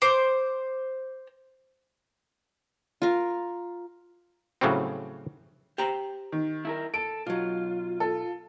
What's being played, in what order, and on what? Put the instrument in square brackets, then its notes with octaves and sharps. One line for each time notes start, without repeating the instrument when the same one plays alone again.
[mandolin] C5 D6
[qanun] F4 A#4
[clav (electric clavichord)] A2 C#3 F#3 G3 C4
[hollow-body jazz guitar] G4 C5 A#5
[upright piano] D#3
[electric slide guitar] E4 A4 A#4
[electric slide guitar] A4 [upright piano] D7
[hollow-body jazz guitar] B1 F#3 [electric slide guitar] F4
[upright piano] A4